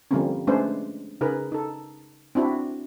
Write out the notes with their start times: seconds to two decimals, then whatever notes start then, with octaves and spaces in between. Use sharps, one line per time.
0.11 D3 F3 G3 A#3 C4 C#4
0.47 G#3 A3 C#4 D4 B4 C5
1.21 C#3 D#4 G#4 A#4 B4
1.52 D#4 A4
2.35 C4 D4 E4 F#4